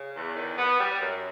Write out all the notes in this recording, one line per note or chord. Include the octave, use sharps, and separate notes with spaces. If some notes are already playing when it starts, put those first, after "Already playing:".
Already playing: C#3
E2
D#3
B3
G3
F#2